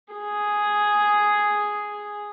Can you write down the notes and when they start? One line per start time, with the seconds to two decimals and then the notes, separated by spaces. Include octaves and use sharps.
0.13 G#4